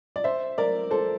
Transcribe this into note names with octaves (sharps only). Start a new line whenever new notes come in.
D5
C5 E5
A#4 D5
A4 C5